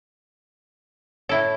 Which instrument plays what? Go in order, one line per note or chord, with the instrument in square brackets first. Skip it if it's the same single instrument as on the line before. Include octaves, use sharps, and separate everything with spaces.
[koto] A2 E4 A4 [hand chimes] C#5 E5